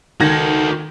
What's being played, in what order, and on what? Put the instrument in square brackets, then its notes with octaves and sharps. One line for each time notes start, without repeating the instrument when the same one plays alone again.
[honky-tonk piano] D#3 G#6 A#6 [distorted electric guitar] F#4 A4